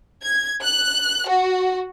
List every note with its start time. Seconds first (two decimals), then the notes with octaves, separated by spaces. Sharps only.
0.23 G#6
0.63 F#6
1.28 F#4